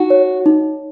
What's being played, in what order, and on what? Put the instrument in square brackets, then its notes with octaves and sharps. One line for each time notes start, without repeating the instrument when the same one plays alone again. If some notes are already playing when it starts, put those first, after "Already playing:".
Already playing: [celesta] D#4 [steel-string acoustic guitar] F#4
[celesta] C#5
D#4